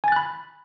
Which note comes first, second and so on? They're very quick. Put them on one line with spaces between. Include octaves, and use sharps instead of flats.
G#5 A6 F#6 B5